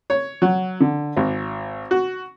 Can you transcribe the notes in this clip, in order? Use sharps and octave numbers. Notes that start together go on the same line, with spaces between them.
C#5
F#3
D3
G#1
F#4